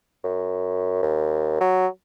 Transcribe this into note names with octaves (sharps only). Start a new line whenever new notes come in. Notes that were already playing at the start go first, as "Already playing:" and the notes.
F#2
D#2
F#3